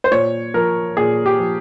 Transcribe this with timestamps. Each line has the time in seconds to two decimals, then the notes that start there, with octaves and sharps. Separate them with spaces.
0.04 C5
0.11 A#2 C#5
0.54 F3 A#4
0.97 A#2 G#4
1.26 G4
1.39 F3